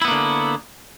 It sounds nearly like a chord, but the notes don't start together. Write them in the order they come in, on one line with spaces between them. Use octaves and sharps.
E4 B3 A#3 D3